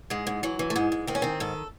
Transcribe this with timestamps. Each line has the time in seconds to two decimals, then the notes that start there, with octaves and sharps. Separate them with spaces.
0.10 G#2 G#3
0.27 G#2
0.43 E3 F#3
0.59 E3
0.70 A3
0.76 G#2 G#3
0.92 G#2
1.07 D#3 C4
1.15 C#4
1.22 D#3 C4
1.40 G#2 A4